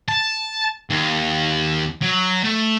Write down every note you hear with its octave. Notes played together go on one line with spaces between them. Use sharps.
A5
D#2
F#3
A3